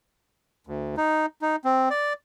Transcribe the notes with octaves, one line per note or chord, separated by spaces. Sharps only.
D2
D#4
D#4
C4
D5